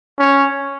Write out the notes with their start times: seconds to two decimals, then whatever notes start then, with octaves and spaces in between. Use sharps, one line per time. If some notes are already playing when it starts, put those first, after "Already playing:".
0.19 C#4